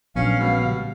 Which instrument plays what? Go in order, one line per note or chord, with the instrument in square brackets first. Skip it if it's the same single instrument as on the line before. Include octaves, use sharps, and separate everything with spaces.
[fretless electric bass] A#1 A#2 [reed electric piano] F#3 B3 D4 [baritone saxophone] C#4 [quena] F5
[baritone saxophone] B2 [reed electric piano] G#3 B3 C#4
[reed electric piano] C#3 G3